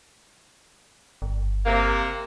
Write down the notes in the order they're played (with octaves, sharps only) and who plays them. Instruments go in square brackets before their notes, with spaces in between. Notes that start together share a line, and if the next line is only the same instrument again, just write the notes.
[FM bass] G1
[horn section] C3 A#3